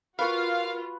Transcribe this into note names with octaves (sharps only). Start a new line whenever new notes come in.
F4 F#4 A#4 B4 F5 C#6